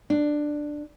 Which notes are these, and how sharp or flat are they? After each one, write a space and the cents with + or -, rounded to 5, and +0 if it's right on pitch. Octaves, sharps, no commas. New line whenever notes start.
D4 +10